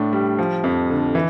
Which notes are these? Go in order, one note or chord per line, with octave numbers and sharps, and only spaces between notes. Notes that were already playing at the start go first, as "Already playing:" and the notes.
Already playing: A2 D4
G3
F3
F2
D3
E3